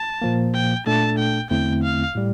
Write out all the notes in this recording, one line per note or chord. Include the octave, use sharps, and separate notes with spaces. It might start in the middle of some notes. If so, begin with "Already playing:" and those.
Already playing: A5
A#2 F3 A#3
G5
A#2 A3 D4 A4 A5
G5
E2 D3 A3 C4 E4 G5
F5
A2 G3